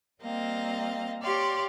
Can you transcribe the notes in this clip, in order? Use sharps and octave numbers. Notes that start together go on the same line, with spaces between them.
G3 A#3 C4 D#5 F5
G4 C#5 D5 F5 C6